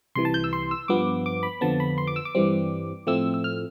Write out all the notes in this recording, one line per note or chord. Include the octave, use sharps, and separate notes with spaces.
C2 C3 E3 C6
A5
G6
E6
C6
E6
G2 F3 B3 D6
D6
B5
F2 D3 F3 B3 A5
B5
C6
D6
E6
D6
G2 E3 G3 C4
A2 F3 A3 C4 E6
E6
F6